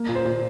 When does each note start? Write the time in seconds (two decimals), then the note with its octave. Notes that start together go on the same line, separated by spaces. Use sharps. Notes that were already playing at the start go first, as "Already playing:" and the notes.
Already playing: A#3
0.09 A#2
0.15 C5
0.25 A#2